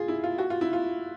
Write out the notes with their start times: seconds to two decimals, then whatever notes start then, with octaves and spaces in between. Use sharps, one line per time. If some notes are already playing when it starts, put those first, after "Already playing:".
Already playing: F4 G#4
0.08 E4
0.24 F4
0.38 F#4
0.50 F4
0.61 E4
0.73 F4